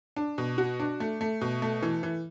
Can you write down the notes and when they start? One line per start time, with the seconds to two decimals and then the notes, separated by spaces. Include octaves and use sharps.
0.16 D4
0.38 B2
0.58 F#4
0.80 D4
1.00 A3
1.21 A3
1.41 B2
1.62 A3
1.83 E3
2.03 E3